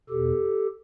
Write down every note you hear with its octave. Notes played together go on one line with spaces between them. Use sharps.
E2 B2 G4 A4